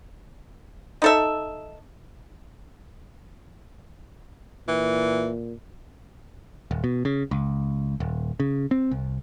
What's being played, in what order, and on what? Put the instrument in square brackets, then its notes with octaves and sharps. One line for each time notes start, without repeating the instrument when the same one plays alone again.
[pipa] D#4 A4 E5
[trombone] A#2 [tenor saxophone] E3
[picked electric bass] D#1
B2
C#3
C#2
D#1
C#3
C4
C2